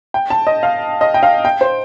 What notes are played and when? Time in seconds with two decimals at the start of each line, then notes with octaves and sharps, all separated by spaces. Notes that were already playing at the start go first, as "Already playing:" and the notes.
0.14 G5
0.30 A5
0.47 D#5
0.63 F5
1.01 D#5
1.14 G5
1.23 F5
1.45 G5
1.61 C5